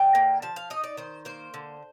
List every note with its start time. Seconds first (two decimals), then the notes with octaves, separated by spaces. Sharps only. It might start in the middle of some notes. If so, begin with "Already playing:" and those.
Already playing: D3 G5
0.15 A#3
0.42 F3 A5
0.56 F5
0.70 D#4 D#5
0.84 D5
0.97 D#3 C5
1.25 A#3 C5
1.54 D3